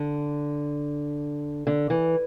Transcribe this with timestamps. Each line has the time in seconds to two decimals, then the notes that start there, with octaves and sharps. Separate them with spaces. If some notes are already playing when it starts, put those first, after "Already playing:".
Already playing: D3
1.67 D3
1.90 E3